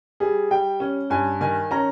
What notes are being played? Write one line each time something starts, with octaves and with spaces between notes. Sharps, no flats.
G3 G#4
G3 G5
C#4
G2 G#5
D#3 G#5
C#4 A#5